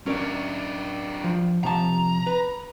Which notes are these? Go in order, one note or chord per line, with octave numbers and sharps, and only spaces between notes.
F#3 C#4 D4 A#4 D5
F3
C3 F3 A5 A#5
B4